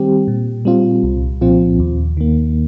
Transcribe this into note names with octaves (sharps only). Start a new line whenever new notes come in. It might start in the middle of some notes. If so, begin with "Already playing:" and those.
Already playing: D#3 G3 C4 G4
A#2
G3 C4 F4
C2
A#2 F3 C4 F4
D#2
D#3 A#3